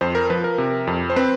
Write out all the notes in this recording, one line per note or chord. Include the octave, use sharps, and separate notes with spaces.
F2 C5
A#4
F3 B4
A#4
C3
F2
C5
C4 B4